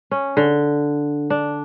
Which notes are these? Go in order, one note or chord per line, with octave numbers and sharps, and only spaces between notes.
C#4
D3
D4